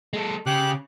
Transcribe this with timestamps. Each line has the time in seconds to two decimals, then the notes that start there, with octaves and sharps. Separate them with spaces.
0.13 G#3 A4
0.46 C#3 G4 F#6